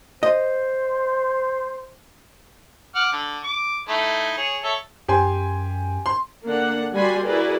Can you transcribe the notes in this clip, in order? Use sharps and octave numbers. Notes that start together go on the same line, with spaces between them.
C5 D#5
F#5 D6 F6
D3
D6
A3 D#4 E4
G#4 C#5
A4 C#5 E5
F#2 G4 G#5 C6
C6
D3 A#3 D4 F#5
G3 F#4 D5 G#5 B5 C6
E4 F#4 G#4 A#4 B4 D5